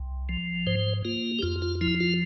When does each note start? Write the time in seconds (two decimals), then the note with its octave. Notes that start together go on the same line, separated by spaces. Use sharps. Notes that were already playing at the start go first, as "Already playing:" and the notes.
Already playing: C2
0.29 F3
0.67 G#2 C5
1.05 A#3 F4
1.39 G4
1.42 F2 F4
1.62 F4
1.81 F3 E4
2.00 F4